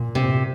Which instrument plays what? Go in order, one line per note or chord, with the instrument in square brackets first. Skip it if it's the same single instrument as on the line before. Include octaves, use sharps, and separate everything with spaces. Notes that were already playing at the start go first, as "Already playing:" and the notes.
Already playing: [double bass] A#2
[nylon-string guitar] C3